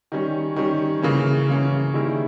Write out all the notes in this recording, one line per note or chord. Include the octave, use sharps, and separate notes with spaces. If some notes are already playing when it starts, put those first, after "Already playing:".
D#3 G3 C#4
D#3 G3 C#4
C#3 E3 A#3 C#4
C#3 E3 A#3 C#4
D#3 G3 A#3 E4 G#4